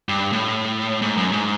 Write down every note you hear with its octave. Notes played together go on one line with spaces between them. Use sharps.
G2
A2
G#2
F#2
G#2